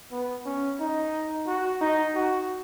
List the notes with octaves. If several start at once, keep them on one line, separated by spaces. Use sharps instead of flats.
B3
C#4
D#4
F#4
D#4
F#4